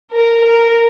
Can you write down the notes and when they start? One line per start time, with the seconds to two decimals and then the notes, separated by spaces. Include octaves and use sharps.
0.12 A#4
0.44 A#4